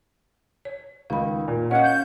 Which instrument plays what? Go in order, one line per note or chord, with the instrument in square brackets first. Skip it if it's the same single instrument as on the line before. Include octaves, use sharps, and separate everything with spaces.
[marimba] C#5
[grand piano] C#2 D#3 [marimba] F5 B5
[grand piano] A#2
[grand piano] C#4 [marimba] D#5 F5 [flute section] F#5
[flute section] G6